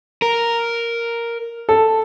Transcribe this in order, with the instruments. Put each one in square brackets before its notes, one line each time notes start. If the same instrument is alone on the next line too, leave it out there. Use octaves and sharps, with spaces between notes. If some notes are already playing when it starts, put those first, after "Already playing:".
[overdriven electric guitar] A#4
[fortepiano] A4